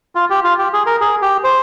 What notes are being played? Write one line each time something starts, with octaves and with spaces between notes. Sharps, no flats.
F4
G4
F4
G4
G#4
A#4
G#4
G4
C5